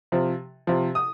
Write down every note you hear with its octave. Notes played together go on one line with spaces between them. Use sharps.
C3 F3
C3 F3
D#6